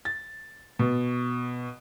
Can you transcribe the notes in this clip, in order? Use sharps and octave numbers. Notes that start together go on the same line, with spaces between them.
A6
B2